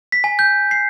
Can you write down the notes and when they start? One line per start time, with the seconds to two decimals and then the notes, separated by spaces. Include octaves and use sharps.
0.12 B6
0.24 G#5
0.39 G6
0.71 C7